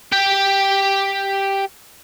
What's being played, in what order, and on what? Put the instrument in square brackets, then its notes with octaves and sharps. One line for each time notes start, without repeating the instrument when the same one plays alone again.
[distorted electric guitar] G4 G5